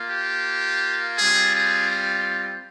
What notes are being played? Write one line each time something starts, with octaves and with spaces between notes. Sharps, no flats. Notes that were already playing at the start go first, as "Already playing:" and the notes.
Already playing: A#3 F4
G4
G3 C4 F4 G#4
G#4